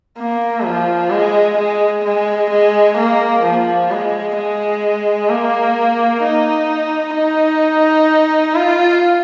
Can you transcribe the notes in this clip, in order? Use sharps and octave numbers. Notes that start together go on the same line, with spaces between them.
A#3
F3
G#3
G#3
G#3
G#3
A#3
F3
G#3
G#3
A#3
D#4
D#4
F4